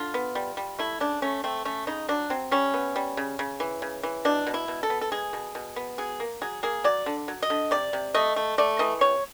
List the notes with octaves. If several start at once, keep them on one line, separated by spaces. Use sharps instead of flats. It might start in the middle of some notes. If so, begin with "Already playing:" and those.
Already playing: D3 F4
B3
G3
G3
A3 E4
C#3 D4
A3 C#4
A3 C4
A3 C#4
C#3 D#4
F#3 D4
F#3 C4
G3 C#4
B3
G3
C#3
C#3
E3
C#3
E3
B2 D4
B2
E4
B2
A4
B3
A4
G#3 G#4
B2
B2
B3
F#3 G#4
A#3
F#3 G#4
A#3 G#4
F#3 D5
D3
F#3
D#5
D3
C3 D5
C3
A3 D#5
A3
A3 D5
E3 D#5
C3 C#5